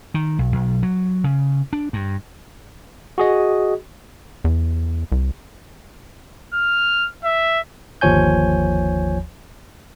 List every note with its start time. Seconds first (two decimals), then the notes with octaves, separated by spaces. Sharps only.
0.14 D#3
0.39 B1
0.52 B1
0.83 F#3
1.24 C#3
1.73 D4
1.93 G2
3.18 F#4 G#4 D#5
4.44 E2
5.12 C2
6.54 F6
7.24 E5
8.01 G1 D#2 F3 C#5 G#5 G6